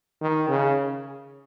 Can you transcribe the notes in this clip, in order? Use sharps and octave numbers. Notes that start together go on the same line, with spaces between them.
D#3
C#3